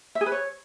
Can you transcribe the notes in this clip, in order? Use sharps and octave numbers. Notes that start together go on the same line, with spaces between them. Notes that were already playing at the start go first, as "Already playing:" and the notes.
E5
G#4
B4
C#5